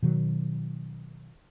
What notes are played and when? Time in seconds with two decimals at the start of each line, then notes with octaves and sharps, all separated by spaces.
0.03 B2 D#3 F#3